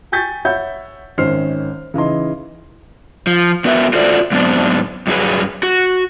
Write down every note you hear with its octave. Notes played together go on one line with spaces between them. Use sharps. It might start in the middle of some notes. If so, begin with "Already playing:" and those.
G5 G#5 C#6 G6 A6 B6
C#5 E5 F#5 B5 G6 A6
G#1 D#3 C#4 C5 F6 C7
C#3 E3 D#4 C6
F3
G2 B3 F#4 A#4 B4 E5
F4 F#4 A4 C5 D5
G#2 F#3 B3 C4 D4
G2 F#3 D#4 G#4 B4
F#4